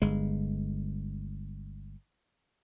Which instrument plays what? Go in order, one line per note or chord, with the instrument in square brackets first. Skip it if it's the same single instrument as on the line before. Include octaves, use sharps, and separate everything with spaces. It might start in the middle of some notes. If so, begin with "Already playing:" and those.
[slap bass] G1 G#3